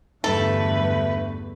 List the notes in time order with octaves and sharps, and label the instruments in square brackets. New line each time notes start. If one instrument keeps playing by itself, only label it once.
[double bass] E2 D3 [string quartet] G2 B4 [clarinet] A3 [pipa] A4